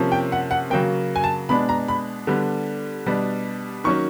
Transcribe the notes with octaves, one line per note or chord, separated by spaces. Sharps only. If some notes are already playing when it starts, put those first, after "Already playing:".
Already playing: C3 F3 A#3 C#4
G5
F#5
F#5
C#3 F#3 A#3 G5
G#5
A5
B2 G#3 B3 D4 B5
A#5
B5
D3 G3 B3 D4
B2 G3 B3 D4
D#3 F#3 A#3 C#4 C#6